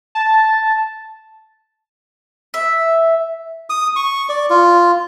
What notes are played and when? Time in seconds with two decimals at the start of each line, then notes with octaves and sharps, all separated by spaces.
0.15 A5
2.54 E5
3.70 D#6
3.96 C#6
4.29 D5
4.50 F4